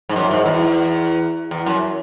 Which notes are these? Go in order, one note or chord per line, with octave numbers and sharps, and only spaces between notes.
G#2
F#2
G#2
E2
E2
F#2